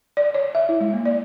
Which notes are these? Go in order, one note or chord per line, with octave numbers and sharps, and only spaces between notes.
D5
C#5
E5
E4
G#3
A#3
D5